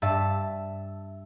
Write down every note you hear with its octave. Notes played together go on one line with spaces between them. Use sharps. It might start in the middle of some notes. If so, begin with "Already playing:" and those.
G2 E5 A5